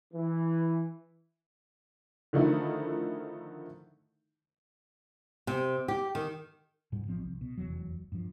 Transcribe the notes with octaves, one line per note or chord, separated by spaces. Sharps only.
E3
D3 D#3 F3 A3 D#4 E4
C3
G4
D#3
G#2 B2 G3
A1 F3 C4
C2
B2
F1 E2 F#3
G2 F3